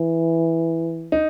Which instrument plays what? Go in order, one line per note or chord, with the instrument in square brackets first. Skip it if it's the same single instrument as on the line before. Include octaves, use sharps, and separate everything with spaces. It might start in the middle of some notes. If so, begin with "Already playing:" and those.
Already playing: [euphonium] E3
[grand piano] D#4